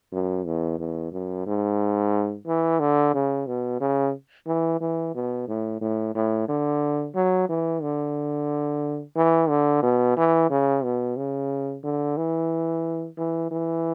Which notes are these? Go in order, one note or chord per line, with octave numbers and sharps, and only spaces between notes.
F#2
E2
E2
F#2
G#2
E3
D3
C#3
B2
C#3
E3
E3
B2
A2
A2
A2
D3
F#3
E3
D3
E3
D3
B2
E3
C#3
B2
C#3
D3
E3
E3
E3